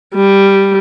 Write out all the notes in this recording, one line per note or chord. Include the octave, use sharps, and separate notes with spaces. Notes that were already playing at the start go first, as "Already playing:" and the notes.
G3